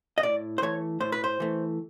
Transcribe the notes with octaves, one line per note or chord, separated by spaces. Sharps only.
D#5
A2 D5
C5
E3 A3 C#5
A2 C5
B4
C5
E3 A3